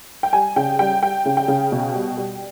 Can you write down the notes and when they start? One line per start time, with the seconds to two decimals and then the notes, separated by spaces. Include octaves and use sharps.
0.23 G5
0.33 G3 G#5
0.56 C#3 G5
0.79 G3 G5
1.02 G3 G5
1.26 C#3
1.37 G5
1.48 C#3
1.72 B2
1.95 G3
2.17 G3